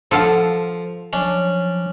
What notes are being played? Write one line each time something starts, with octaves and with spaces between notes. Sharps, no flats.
F3 A4 F5 F#5 A5
F3 F#3 C#4 D4